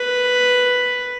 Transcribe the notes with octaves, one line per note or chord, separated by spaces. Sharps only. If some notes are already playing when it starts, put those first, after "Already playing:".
Already playing: B4